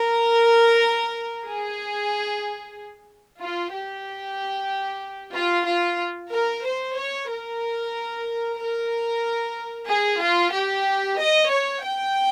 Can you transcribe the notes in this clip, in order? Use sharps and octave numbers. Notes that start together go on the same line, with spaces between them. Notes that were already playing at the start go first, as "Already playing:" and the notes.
Already playing: A#4
G#4
F4
G4
F4
F4
A#4
C5
C#5
A#4
A#4
G#4
F4
G4
D#5
C#5
G5